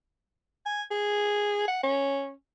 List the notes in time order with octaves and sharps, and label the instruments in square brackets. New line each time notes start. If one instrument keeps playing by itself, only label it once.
[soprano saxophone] G#5
G#4
F#5
C#4